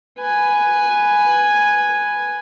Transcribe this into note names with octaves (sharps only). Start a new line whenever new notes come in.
B4 G#5